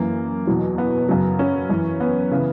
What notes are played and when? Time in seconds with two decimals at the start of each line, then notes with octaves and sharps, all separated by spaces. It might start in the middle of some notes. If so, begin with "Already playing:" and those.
Already playing: F#2 E3 A#3
0.47 E2 B2 F#3
0.78 B3
1.09 F#2 C#3 F#3
1.39 C#4
1.69 F#2 E3
2.00 B3
2.32 C#3 E3